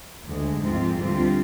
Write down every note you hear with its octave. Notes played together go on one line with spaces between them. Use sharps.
D2 D3 G#3
G#2 F3 C4 F4
D2 D3 G3 C4 F4